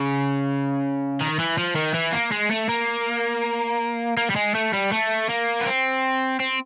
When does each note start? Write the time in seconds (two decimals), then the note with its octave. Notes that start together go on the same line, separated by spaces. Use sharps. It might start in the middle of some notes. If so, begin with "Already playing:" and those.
Already playing: C#3
1.21 D#3
1.39 E3
1.58 F3
1.76 D#3
1.95 E3
2.13 A#3
2.32 G#3
2.51 A3
2.69 A#3
4.17 A#3
4.30 G3
4.36 G#3
4.55 A3
4.73 G3
4.92 A3
5.29 A#3
5.61 B3
5.66 C4
6.40 C4